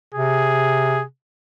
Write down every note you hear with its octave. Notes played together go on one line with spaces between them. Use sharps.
C3 G#4